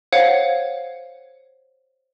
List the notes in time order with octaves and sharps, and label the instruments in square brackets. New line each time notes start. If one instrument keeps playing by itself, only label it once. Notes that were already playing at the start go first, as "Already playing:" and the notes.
[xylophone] C5 C#5 F5 F#5 G#6